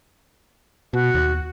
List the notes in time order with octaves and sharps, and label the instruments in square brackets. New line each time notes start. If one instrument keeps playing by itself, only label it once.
[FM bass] B2 [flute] F#4
[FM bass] D#2